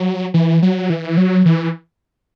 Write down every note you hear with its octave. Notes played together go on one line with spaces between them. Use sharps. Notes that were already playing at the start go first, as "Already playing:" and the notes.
Already playing: F#3
E3
F#3
E3
F#3
E3